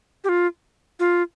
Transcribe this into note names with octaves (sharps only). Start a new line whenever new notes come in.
G4
F4
F4